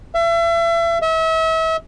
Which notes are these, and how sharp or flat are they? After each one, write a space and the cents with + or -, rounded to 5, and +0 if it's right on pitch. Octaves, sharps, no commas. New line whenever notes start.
E5 +35
E5 -35